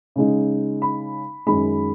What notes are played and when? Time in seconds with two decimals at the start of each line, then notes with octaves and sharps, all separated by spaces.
0.16 C#3 G#3 D#4
0.82 B5
1.47 F#2 D#3 G#3 B5